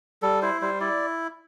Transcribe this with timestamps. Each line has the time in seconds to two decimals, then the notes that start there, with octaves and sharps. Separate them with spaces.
0.22 G3 A4
0.42 E4 C5
0.61 G3 C5
0.80 E4 D5